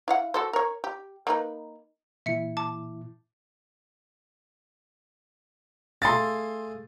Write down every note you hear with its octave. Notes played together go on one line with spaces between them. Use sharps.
E4 F5 F#5
F#4 A4 C5
A#4 C#5
G4
A#3 D#4 B4
A#2 E3 E4 E5 C#7
A5 D6
A3 G#4 F5 C6 A6